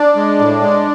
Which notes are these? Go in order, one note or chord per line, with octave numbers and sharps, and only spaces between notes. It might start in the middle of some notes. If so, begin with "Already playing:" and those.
Already playing: D4
G#3
A2
G#3